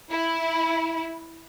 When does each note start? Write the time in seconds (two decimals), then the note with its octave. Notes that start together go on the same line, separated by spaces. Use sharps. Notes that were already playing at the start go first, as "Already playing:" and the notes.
0.11 E4